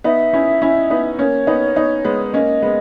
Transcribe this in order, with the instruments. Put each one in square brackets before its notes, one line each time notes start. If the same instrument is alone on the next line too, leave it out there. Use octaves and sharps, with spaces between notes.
[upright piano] B3 D#4 [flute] E5
[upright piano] C#4 E4
C#4 E4
B3 D#4
[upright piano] A#3 C#4 [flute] C#5
[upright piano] B3 D#4
B3 D#4
G#3 B3
[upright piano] A#3 C#4 [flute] D#5
[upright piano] G#3 B3